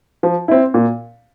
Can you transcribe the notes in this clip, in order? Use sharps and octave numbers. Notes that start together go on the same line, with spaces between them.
F3
C4 E4
A#2